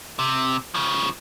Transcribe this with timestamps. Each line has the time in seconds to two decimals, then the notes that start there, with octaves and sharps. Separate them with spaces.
0.19 C3
0.75 C#3 F3